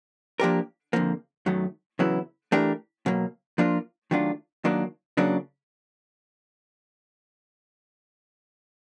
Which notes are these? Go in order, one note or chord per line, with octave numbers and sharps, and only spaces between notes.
F3 A#3 D4 G4 A#4
F2 D3 F3 A#3
F#2 D#3 F#3 A3
E2 C#3 F#3 B3 E4
E3 A3 D4 G4 A#4
B2 F#3 A#3
F3 A#3 D4 F4 A#4
D#3 F#3 A3 D4 F4
D#3 F#3 A#3 D4
C#3 F#3 A#3 D4